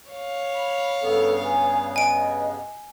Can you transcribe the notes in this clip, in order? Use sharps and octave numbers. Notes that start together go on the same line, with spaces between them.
C#5 F5
B5
G2 C#3 B3 A4
G#5
D#5 G#5 D7